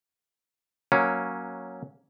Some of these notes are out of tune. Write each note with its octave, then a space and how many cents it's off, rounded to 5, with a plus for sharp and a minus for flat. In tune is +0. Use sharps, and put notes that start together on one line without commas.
F#3 +0 A#3 +10 C#4 +0